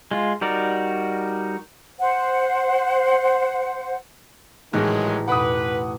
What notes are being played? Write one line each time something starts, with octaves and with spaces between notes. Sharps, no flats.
G#3 F4
G3 D#4 F#4 A#4 D5
C5 F#5
A1 G#2 D#3 F#3 G#3 D#4
F2 B2 B4 F#5 B5 D6 D#6